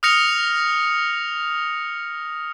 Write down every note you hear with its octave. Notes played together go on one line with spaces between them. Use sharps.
D#6 F6 F#6 A#6 C#7 F7